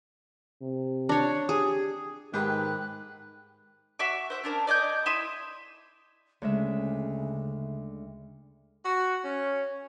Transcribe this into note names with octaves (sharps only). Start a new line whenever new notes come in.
C3
D4 C#5
G4 G#4
G#2 D#3 G4 G#4 B4 F#6
F#4 E5 C#6 D6
C5 E5
C#4 D4 A#4
D5 D#5 G#5 G6
E4 E5 C6 D#6
D2 C#3 G#3 E5
F#4
C#4